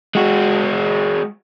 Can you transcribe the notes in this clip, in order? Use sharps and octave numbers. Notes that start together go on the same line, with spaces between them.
G#3 F#4